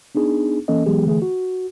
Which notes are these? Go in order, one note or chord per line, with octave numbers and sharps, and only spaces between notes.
B3 D4 D#4 G#4
E3 A#3 C#4 A4 D#5
E3 F#3 G#3 B3 G4 G#4
D3 E3 A3 G#4
F#4